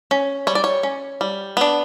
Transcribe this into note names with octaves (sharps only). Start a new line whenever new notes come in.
C#4
G3 C#5
D5
C#5
C#4
G3
B3 D4